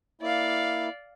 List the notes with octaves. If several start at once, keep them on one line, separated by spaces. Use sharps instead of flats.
A#3 E4 D5 F5